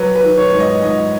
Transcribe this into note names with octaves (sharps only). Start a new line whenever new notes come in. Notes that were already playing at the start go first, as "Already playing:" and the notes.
Already playing: F#3 B4
B4
D#3
C#5
G#2 C#5
D#5
G#2 D#5